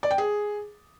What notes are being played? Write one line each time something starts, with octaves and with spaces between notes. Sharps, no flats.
D5
G5
G#4